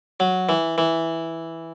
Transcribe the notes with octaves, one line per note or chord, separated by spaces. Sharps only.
F#3
E3
E3